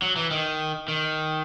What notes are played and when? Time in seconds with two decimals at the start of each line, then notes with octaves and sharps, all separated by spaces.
0.02 F#3
0.16 E3
0.31 D#3
0.88 D#3